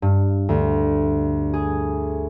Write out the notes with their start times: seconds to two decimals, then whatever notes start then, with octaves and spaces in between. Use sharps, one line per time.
0.02 G2
0.49 D2
1.53 G#4